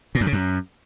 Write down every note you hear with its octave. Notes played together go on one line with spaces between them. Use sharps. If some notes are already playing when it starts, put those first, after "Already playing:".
A#2
F#2
C#3
F#2